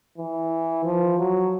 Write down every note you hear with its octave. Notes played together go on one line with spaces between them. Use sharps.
E3
F3
F#3